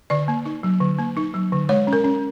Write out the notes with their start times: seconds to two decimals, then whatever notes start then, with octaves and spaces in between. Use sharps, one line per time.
0.10 D3 D5
0.28 A#3
0.46 D#4
0.63 F#3
0.81 D3
0.99 A#3
1.17 D#4
1.34 F#3
1.52 D3
1.69 G#3 C#5
1.87 C#4
1.93 A#4
2.04 C#4